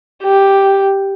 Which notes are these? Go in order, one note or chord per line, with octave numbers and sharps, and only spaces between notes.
G4